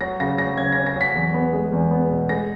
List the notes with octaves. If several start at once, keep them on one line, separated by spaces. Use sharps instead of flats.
F#3 A#6
C#3 A#6
F#3 A#6
C#3 G#6
C#4 A#6
A#6
F#3 B6
E2
B3
G#3
E2
B3
B2
G#3 A#6